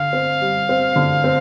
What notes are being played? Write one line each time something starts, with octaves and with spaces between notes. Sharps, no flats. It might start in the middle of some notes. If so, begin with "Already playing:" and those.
Already playing: D3 F5
C4
G3
C4
D3
C4